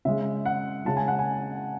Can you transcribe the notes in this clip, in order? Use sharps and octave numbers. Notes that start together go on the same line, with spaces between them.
C#3 G#3 E5
F#5
C#3 G#3 A5
G#5
F#5
G#5